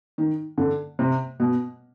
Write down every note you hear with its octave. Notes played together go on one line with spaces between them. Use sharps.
D#3
D3
C3
B2